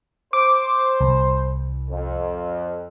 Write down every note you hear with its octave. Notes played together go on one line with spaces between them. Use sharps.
C5 D6
C2
F2